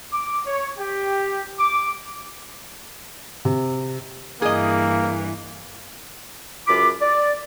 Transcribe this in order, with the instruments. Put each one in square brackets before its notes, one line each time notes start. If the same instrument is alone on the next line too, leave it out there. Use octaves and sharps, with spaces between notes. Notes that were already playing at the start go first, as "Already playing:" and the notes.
[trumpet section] D6
C#5
G4
D6
[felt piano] C3
[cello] G2 E3 [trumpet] A#3 [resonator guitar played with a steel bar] G#4 D#5
[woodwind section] C#2 F#2 F4 B5 D6
D5